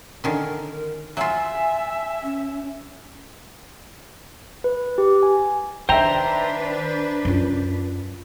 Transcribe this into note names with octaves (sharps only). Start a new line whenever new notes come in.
D3 D#3 C#4 A#4
F#3 F4 E5 G#5
C#4
B4
G4
G#5
D#3 D4 B4 C5 E5 G5 A#5
F#2 F4